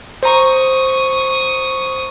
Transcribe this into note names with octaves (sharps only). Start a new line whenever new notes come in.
C5 A#5 C#6 D#6